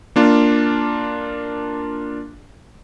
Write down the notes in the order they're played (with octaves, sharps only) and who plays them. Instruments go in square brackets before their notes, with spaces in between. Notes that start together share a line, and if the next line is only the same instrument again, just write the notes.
[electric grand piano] A#3 D4 F4